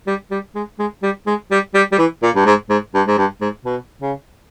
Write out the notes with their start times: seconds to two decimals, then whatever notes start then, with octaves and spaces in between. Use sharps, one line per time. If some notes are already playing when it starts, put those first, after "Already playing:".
0.07 G3
0.31 G3
0.55 G#3
0.79 G#3
1.03 G3
1.27 G#3
1.51 G3
1.74 G3
1.92 G3
1.98 E3
2.22 A#2
2.36 G2
2.46 G#2
2.70 G#2
2.94 G2
3.07 G#2
3.18 G2
3.41 G#2
3.65 B2
4.02 C#3